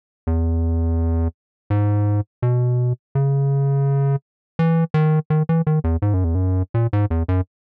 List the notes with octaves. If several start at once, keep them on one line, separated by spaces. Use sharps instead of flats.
E2
G#2
B2
C#3
E3
D#3
D#3
E3
D#3
E2
G#2
F#2
E2
F#2
A#2
G#2
E2
F#2